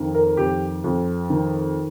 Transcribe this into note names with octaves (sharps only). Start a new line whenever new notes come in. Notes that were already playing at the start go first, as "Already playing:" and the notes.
Already playing: F2 D#3
A#4
F2 G4
F2
D#3